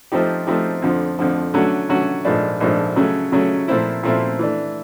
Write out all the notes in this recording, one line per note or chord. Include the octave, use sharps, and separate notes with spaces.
F3 A3 C4 D#4 G4
F3 A3 C4 D#4 G4
F2 D3 F3
F2 D3 F3
D3 F#3 A3 C#4 F#4
D3 F#3 A3 C#4 F#4
A#1 G#2 F3 A3 D4
A#1 G#2 F3 A3 D4
C#3 F#3 A3 C#4
C#3 F#3 A3 C#4
A#2 F3 A3 C4 E4
A#2 F3 A3 C4 E4
E3 A3 D4